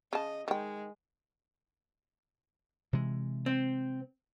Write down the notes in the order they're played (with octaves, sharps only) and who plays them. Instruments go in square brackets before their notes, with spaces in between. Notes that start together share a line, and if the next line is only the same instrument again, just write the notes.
[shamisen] C#3 A5 [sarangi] D#5
[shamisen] D#3 G5 [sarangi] G#3
[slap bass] C3 E3 G#3
[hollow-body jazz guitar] C4